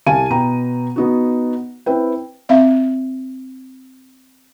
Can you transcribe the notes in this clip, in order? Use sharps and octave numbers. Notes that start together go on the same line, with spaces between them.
C2 G4 F5 G#5 A5 D#7
B2 B3 G5 A#5
B3 D#4 F#4
C4 E4 B4 G5
C4 E5 F5